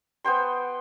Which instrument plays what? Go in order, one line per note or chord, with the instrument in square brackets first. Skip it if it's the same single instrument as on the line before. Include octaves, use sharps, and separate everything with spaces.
[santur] B3 C5 G5 C6